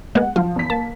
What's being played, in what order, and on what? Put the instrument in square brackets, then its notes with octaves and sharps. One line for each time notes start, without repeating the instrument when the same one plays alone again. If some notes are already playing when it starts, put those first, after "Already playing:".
[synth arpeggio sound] G#3 A#3 B3 [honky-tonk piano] F#5
[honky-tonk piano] F3 [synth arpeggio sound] F4
[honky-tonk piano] E2 B6
[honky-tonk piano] A#3 [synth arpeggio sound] A5